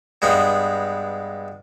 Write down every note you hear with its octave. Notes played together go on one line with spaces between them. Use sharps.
G2 G#3 B3 B5